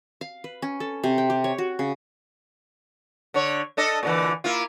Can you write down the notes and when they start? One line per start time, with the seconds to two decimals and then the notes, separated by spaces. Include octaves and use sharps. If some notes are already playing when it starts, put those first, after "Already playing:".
0.21 F5
0.44 B4
0.62 C#4
0.80 A4
1.04 C3
1.18 G5
1.30 G4
1.44 C#5
1.58 F#4
1.79 C#3
3.34 D3 C#5
3.77 D4 A4 D#5
4.03 A#2 D3 E3
4.44 A#3 E4 F4